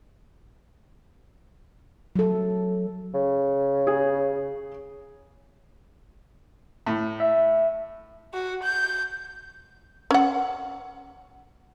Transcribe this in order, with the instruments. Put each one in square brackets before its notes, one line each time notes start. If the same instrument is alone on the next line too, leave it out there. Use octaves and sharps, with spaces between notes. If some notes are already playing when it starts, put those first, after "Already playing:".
[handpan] F#3 A4
[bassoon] C#3
[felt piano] G#4
[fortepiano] A2
[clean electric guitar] E5
[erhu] F#4
G6
[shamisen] C#4 F#5